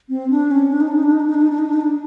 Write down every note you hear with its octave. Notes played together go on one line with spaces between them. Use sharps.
C4
D4
C#4
D4
D#4
D4
D#4
D4
D#4
D4
D#4
D4
D#4
D4
D#4
D4
D#4
D4